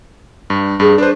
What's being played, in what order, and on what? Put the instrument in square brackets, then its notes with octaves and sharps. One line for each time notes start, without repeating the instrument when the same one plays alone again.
[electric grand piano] G2
[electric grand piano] G2 [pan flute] G#4
[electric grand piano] D4 C5 [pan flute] B4